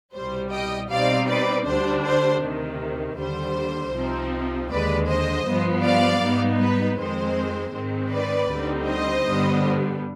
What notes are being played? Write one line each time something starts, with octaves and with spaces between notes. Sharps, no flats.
C2 B2 G3 C5
D#5 G5
B2 G3 C4 D#4 D5 F5
B4 D5
D2 D3 G3 D4 C5
C5
D2 C3 D#3
D#2 D3 G3 C5
C2 C3 F3 C4 D#4
D#2 D3 G#3 B4 D5
C5 D#5
G2 F3 B3
D5 F5
G#2 G3 B3 D#4
B4
F2 D#3 G#3 C4 C5
G#2 D#3 G#3 C4
B4 D5
D2 D3 G3 C4 D#4
C5 D#5
G2 D3 G3 B3